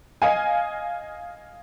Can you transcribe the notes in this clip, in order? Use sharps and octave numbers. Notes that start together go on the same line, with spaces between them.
D#5 F5 G#5